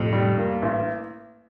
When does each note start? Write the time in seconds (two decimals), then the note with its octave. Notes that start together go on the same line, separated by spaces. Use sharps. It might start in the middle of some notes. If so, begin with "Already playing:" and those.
Already playing: F2 A2 C3
0.13 G3
0.38 A#3
0.62 A1